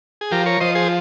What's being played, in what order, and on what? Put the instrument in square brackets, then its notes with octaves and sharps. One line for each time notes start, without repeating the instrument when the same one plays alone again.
[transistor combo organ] G#4
F3 G4 A#4
A#4 C#5
F3 C5 D#5
G#4 C5